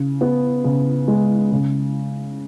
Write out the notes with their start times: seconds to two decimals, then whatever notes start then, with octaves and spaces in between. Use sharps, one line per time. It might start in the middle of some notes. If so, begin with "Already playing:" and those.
Already playing: C#3
0.21 B3
0.64 C#3
1.08 G#3
1.51 C#3